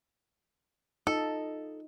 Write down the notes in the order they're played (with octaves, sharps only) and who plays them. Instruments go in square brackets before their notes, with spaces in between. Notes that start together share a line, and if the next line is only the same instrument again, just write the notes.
[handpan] D#4 F4 D#5 [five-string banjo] A4